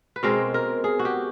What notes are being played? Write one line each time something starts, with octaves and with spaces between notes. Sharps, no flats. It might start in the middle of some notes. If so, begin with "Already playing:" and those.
B4
B2 G#3 C4 A#4
A#4
G#4
F#4
G4